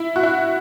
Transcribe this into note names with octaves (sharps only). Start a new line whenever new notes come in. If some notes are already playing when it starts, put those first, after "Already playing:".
Already playing: E4
F#4
E4